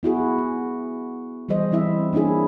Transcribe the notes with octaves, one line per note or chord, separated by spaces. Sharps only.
B3 E4 F#4 G#4
G#4
E3 G3 G#4 C5 D#5
E3 C4 E4 E5
A#3 C#4 D4 E4 G#4